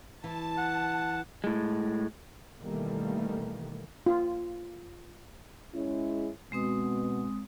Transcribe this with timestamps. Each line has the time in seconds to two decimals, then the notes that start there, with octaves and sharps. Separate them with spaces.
0.24 E3 A5
0.58 F#5
1.44 A2 G#3
2.62 B2 D#3 E3 G3 A3 A#3
4.06 F4
5.75 G#3 C#4 E4
6.52 B2 G#3 C4 D#6